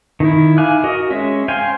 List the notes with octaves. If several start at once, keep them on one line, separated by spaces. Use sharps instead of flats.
D#3 E4
E5 F5 G#5 D6 F#6
F#4 A#4 D#5
G#3 C#4 E5
C5 F5 G5 G#5